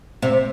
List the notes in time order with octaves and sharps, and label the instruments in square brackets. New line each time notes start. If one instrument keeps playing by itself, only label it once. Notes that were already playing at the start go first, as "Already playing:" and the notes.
[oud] C3